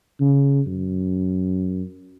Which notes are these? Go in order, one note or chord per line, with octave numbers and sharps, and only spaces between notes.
C#3
F#2